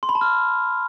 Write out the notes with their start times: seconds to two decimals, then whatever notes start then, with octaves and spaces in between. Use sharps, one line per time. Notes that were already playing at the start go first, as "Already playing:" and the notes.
0.03 C6
0.09 B5
0.15 A5
0.21 F6